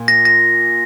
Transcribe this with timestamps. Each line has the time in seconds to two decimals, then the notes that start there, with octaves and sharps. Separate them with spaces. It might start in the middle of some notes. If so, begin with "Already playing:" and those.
Already playing: A#2
0.08 A#6
0.25 A#6